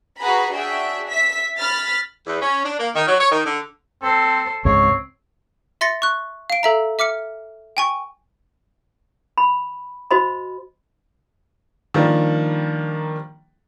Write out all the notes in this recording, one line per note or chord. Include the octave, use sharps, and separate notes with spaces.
F#4 G#4 B4 A#5 B5
D4 F#4 G#4 E5 G5
E5 B6
B5 F6 A6 B6
E2
C#4
D4
A#3
D#3
F#3
C#5
D#3
D3
C4 A4 C5
C#2 G#2 C4 C#5
E5 C6 A6 A#6 C#7
C#6 F#6
F5 D7
A4 E5 A#5
E5 D6 F6 C#7
G5 G#5 C#6
B5
F#4 C5 D#5 B5
D#3 F3 G3 A#3 D4